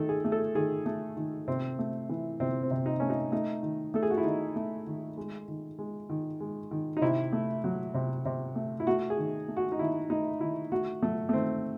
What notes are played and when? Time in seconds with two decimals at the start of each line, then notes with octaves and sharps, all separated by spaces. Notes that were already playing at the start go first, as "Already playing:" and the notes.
Already playing: D#3 A3 A4
0.09 G#4
0.25 A3
0.32 A4
0.55 D#3 G#4
0.86 A3
1.17 D#3
1.48 C3 C4
1.79 A3
2.09 E3
2.40 C3 C4
2.63 C4
2.71 C3
2.86 D#4
3.00 A3 C#4
3.10 D#4
3.32 A3 D#4
3.63 D#3
3.94 A3 A4
4.03 G#4
4.10 F#4
4.17 E4
4.24 D#3 D#4
4.56 A3
4.87 D#3
5.17 G#3
5.48 D#3
5.79 G#3
6.10 D#3
6.40 G#3
6.71 D#3
6.97 D#4
7.02 C3 E4
7.33 A3
7.64 F#3
7.94 C3
8.25 C3
8.56 A3
8.80 E4
8.87 A3 F#4
9.10 G#4
9.18 D#3
9.48 A3
9.57 F#4
9.72 D#4
9.79 D#3 E4
10.10 A3 D#4
10.40 D#3 E4
10.72 A3 F#4
11.02 F#3 A3
11.29 A3
11.33 D#3 C4